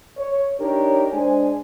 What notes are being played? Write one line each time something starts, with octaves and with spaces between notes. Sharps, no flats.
C#5
D4 D#4 G4 A#4 C#5
G#3 D4 C5 G#5